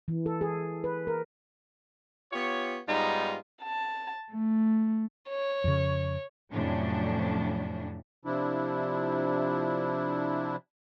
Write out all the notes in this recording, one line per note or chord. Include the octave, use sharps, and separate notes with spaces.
E3
A4
G#4
B4
A#4
B3 F4 G4 C#5
G#2 G3 B3 D#4 F4 A#5
A5
A3
C#5
F2 C#3
F2 A2 C3 F#3 C#4 D4
C3 F3 D4 E4